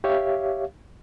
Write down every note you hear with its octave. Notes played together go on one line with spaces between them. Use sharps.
G4 C#5 E5 F5